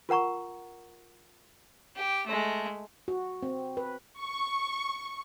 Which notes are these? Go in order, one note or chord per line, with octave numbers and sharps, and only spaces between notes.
F4 A#4 F#5 A#5 C#6
G4
G#3 A3
F#4
C4
B4
C#6